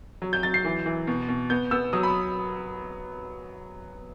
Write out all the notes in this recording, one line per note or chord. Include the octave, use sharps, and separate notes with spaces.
F#3
G6
F#3 A6
C7
E3
E3
B2
B2
B3 G6
B3 E6
F#3 D#6
B5